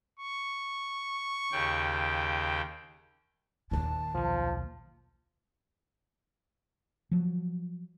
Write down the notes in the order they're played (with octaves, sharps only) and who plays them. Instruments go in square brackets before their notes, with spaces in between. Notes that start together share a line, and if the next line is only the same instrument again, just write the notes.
[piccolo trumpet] C#6
[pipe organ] D#2 C#3 G5
[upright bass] D#2 A#2 [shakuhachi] A5
[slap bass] B1 D#3 [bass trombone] F3
[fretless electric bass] F3 F#3